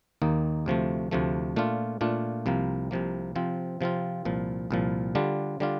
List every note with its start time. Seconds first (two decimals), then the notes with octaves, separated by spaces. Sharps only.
0.22 D#2 D#3 A#3 D#4
0.66 D2 C3 F3 A3
1.11 D2 C3 F3 A3
1.56 A#2 A3 D4 F4
2.01 A#2 A3 D4 F4
2.46 C2 C3 F3 A#3
2.91 C2 C3 F3 A#3
3.35 C3 F3 C4 F4
3.81 C3 F3 C4 F4
4.25 C2 A#2 F3
4.71 C2 A#2 F3
5.15 D3 G3 D4 F4
5.60 D3 G3 D4 F4